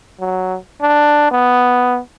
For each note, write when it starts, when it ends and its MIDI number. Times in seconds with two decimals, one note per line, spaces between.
0.20 0.57 54
0.81 1.27 62
1.31 1.99 59